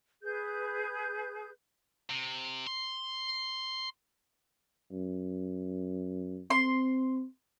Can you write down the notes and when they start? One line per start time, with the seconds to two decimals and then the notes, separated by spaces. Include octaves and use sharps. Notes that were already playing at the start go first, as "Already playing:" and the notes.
0.22 G#4 B4 G6
2.10 C3
2.67 C6
4.92 F#2
6.50 C4 C6